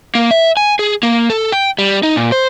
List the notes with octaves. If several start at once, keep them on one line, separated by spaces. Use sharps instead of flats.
A#3
E5
G#5
G#4
A#3
A4
G5
G3
D#4
A#2
C5